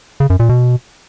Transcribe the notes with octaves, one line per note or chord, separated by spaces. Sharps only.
C#3
F#2
A#2
B2